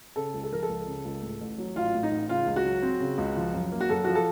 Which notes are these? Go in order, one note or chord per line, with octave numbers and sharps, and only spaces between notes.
C#3 A4
C#2
A4
F3 A#4
A4
C#2
C#3
C#2
A2
A1
F#3
A1 F4
A2
D#4
A1
C#3 F4
C#2
F#4
F#3
C4
C#3
C#2
F3
F#2
A#3
F#4
F#2 A4
F3 F#4
A4